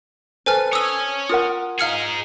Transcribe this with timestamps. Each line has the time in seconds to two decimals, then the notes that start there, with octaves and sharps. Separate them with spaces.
0.46 A4 B4 C5 G#5 F6
0.73 C#5 G#5 D#6 E6
1.29 F4 A#4 F#5 D#6
1.79 D#4 G#4 F5 F6 C#7